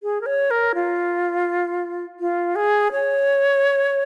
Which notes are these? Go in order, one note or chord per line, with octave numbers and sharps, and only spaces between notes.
G#4
A#4
C#5
A#4
F4
F4
G#4
C#5